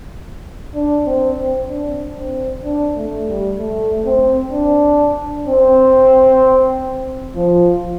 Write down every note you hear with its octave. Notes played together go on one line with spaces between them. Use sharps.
D4
C4
C4
D4
C4
D4
A3
G3
A3
C4
D4
C4
F3